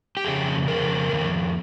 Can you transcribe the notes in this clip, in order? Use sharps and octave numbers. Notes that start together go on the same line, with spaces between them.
G4
F2 C#3 G#4
F2 C#3 A#4
F2 D#3